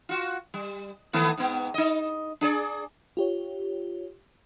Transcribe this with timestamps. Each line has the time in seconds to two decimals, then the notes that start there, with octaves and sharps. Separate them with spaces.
0.09 F4 F#4
0.54 G3
1.13 D#3 A3 B3
1.38 G#2 B3
1.74 D#4 D#5
2.41 D4 G#4 D5
3.17 F4 G4 C#5